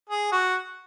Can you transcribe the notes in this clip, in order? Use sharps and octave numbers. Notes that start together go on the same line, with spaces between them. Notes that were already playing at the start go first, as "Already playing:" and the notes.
G#4
F#4